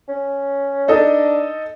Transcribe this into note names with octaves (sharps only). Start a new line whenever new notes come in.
C#4
D4 D#4 A4 D#5